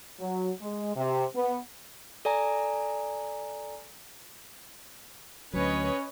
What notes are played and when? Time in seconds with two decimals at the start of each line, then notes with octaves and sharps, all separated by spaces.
0.19 F#3
0.61 G#3
0.95 C3
1.35 B3
2.25 A4 D5 G#5 A#5
5.53 D2 F#3 C#4 B4 C#5 D#5